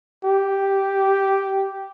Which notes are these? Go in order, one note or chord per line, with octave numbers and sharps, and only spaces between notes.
G4